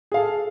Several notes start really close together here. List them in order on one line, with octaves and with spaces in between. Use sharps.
G#4 F5 A4